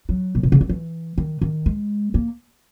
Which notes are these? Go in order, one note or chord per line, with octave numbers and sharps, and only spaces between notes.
F#3
A#2
B2
C#3
D#3
E3
D#3
D#3
G#3
A#3